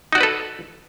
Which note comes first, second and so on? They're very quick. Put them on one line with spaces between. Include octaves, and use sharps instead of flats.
D#4 F#4 D5 B4 A4